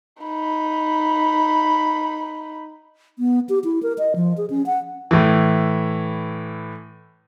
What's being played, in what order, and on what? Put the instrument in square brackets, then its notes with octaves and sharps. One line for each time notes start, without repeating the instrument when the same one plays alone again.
[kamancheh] D#4 B5
[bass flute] B3
G4
E4
A#4
D#5
F3
G#4
C#4
F#5
[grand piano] A2 E3